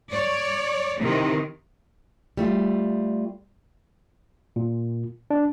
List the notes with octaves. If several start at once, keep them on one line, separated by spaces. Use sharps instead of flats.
C#5 D5
C3 D#3 E3
G3 A3 F4
A#2
D4